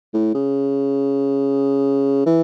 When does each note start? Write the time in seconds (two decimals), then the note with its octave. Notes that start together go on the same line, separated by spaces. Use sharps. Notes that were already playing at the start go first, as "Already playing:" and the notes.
0.14 A2
0.35 C#3
2.26 E3